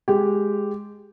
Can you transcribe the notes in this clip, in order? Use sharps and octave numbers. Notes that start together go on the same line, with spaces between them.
G#3 G4